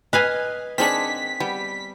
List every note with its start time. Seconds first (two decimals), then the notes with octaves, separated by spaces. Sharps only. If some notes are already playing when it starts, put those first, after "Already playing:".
0.13 B4 D#5 F5 G#5
0.78 D#3 G#3 C4 D4 G#4 F#5 B6
1.40 G3 B3